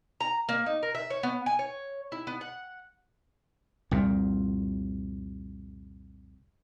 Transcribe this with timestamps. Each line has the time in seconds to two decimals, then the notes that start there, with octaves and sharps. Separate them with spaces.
0.20 A#5
0.49 A#3
0.66 D#4
0.83 A#4
0.95 E5
1.10 C#5
1.23 B3
1.46 G#5
1.59 C#5
2.12 E4
2.27 B3
2.41 F#5
3.91 C2 F2 A#2